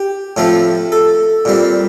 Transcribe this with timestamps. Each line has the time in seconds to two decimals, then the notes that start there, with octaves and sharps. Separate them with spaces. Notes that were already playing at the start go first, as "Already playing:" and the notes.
Already playing: G4
0.37 A2 F3 A3 C4
0.92 A4
1.45 A#2 G3 C4